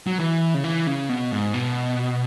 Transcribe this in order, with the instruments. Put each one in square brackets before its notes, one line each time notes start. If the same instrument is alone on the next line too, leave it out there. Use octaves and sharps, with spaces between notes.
[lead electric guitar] F#3
E3
C#3
E3
C#3
B2
G#2
B2